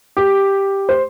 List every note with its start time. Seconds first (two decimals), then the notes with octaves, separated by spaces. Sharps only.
0.17 G4
0.89 C5